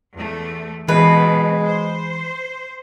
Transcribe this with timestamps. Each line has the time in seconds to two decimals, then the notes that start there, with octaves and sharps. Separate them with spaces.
0.16 E2 A3
0.88 B2 E3 G#3 C4 B4
1.66 C5